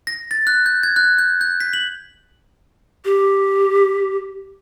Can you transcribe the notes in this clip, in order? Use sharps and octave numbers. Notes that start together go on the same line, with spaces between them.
A#6
A6
F#6
G6
G#6
F#6
G6
G6
B6
F#7
G4